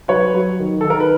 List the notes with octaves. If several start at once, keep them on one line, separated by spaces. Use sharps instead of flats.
F#3 B4 C#5
F#3
D#3
D#3 A4
A#4
B4